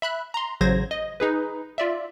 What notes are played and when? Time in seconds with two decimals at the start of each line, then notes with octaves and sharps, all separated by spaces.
0.02 E5 B5 F#6
0.34 A#5 C6
0.61 A1 C#3 F#3 C5 G#6 A#6
0.91 D#5
1.20 D#4 G#4 B4
1.78 F4 D5 E5